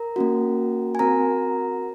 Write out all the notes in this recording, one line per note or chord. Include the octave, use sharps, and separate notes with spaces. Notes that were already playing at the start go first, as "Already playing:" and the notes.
Already playing: A#4 A#5
A#3 C#4 F#4
G#5
C4 F#4 A#4 A#5